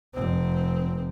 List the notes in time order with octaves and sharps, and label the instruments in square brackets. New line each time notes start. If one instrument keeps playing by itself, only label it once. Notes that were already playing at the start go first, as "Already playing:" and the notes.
[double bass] F1 C4